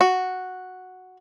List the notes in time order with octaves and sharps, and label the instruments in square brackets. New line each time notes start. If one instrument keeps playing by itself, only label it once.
[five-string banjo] F#4